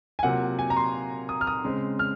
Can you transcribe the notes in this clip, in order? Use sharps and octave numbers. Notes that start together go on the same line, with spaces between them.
G#5
C3 F#3 A#3 F4 F#5
G#5
A#5
C6
D#6
F6
D#6
C#3 G#3 C4
F6